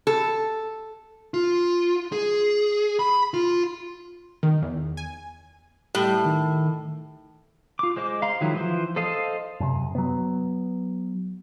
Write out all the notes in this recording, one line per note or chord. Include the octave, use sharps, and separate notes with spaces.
A4
F4
G#4
B5
F4
D#3
E2
G#5
A2 G3
D#3
F4 D6
G#3 C5 D#5 D6
F5 A#5 C6
D#3 F3 F#3 G#3 E4
E3 F3 C5
A4 C5 D#5 F5 A5
F#2 C3
F#3 B3